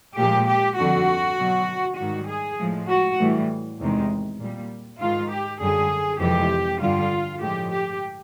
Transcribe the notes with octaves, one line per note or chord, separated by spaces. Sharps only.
A#2 F3 G#3 G4
G4
F2 D3 G3 F#4
B2 F#3
G#2 D#3 G3 F#4
G#4
A2 F3 G#3
F#4
A2 E3 G3
E2 C3 D#3 G#3
A#2 G3
G#2 D#3 G#3 F4
G4
F#2 D3 G3 G#4
F2 C3 E3 G#3 G4
G2 D3 G3 F4
A2 F3 G#3 G4
G4